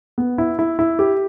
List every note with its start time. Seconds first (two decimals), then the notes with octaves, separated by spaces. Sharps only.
0.18 B3
0.38 E4
0.59 E4
0.79 E4
0.99 G4